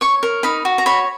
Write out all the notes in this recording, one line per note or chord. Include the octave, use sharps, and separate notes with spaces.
C#5 C#6
A#4
D#4 B5
F#4
A#5
C#5 B5